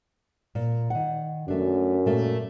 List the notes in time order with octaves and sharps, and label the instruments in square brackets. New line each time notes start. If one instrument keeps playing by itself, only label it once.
[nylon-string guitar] A#2
D#3 F#5
[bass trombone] F#2 [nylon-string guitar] A3 D4
[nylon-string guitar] A#2 A3 A#3